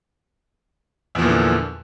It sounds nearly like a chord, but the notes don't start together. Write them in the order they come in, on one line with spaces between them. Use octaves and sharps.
E2 F3 A#2 E3 D3